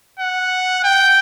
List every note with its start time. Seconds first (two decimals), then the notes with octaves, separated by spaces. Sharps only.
0.19 F#5
0.84 G5